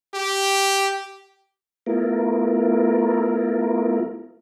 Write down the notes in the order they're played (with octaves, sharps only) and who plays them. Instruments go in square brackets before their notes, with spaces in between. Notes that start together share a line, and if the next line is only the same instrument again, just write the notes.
[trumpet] G4
[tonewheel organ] A3 B3 E4 F4 A#4